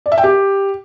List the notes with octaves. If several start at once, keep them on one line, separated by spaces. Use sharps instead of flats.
D5
E5
G5
G4